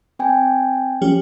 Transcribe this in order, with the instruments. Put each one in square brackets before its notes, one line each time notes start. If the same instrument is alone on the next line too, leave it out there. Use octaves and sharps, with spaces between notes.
[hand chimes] C4 G5 G#5
[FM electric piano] F3 C#4 G4